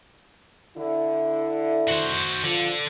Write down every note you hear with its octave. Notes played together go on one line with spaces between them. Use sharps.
D3 E4
F#4 C5
D3 F3